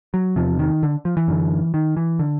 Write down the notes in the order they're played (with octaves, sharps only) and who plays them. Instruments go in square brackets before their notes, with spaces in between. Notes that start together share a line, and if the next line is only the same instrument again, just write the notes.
[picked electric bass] F#3
E2 C3 F3
D#3
D3
F3
E3
F#2 D3
D#3
E3
D3